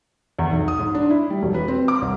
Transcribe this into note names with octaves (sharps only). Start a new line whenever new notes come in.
E2
B1
D#6
G#2
D4
E4
G3
E1
B4
C4
D6
C2